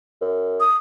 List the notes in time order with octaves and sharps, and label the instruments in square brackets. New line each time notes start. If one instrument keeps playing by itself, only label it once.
[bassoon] F#2
[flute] D#6